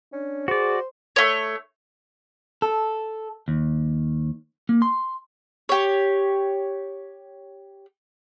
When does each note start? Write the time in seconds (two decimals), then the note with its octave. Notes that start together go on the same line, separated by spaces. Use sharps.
0.13 C#4 D4
0.48 F#4 G#4 C5 D5
1.16 A3 C#5
2.62 A4
3.48 D#2
4.69 A#3
4.82 C6
5.69 G4 C#5